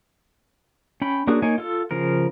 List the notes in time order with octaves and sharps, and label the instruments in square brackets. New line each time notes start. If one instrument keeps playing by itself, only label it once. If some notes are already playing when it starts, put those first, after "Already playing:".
[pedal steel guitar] C#4 G5 B5
A#3 C#4 D4 F#4 G#4
A#3 D#4 C#5 G#5
F4 A4
C#3 F3 A#4